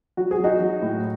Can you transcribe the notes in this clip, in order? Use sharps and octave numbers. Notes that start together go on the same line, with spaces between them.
F#3 F#4
G#4
F#3 D#4 F#4
F#3
A2